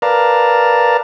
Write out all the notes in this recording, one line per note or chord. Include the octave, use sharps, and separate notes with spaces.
A#4 B4 D5 F5 A5 A#5